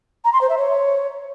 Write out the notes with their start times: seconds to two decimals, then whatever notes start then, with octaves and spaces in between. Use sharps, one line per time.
0.25 A#5
0.33 C6
0.41 C5
0.49 E5
0.58 C#5